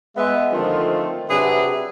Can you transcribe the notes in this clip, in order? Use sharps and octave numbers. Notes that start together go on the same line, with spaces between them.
G#3 B3 E5
D3 D#3 F3 A3 C4 F4
C3 F#3 D4 G#4 B4 E5